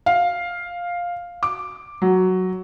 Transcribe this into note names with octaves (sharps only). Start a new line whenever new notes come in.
F5
D6
F#3